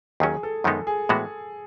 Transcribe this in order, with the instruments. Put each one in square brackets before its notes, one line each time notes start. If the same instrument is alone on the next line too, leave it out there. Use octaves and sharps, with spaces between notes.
[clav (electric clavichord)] D#2 D#3 F#3 C#4 [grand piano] G#4
[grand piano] A4
[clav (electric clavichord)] F#2 D#3 G#3 B3 D#4 [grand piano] A4
[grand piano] G#4
[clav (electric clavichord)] A2 E3 G#3 B3 F#4